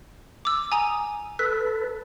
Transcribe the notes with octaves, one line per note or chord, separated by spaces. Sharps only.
D6 E6
G#5 A#5 D#6
A4 B4 B6